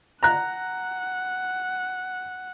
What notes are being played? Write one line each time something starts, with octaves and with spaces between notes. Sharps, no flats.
F#5 A#5 F#6